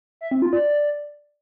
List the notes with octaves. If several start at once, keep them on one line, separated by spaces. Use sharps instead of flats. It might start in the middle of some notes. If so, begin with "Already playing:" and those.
E5
C4
F4
D5